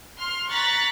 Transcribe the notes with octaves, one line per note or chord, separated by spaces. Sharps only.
C6 F6
A#5 C#6 F#6 A6 B6